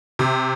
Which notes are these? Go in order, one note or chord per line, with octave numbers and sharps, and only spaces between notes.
C3